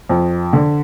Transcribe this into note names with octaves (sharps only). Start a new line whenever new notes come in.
F2
D3